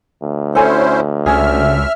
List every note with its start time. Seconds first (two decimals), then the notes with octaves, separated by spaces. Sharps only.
0.22 D2
0.55 C#4 E4 A4 C5 G#5
1.26 C#2 C#4 G#4 E5 F6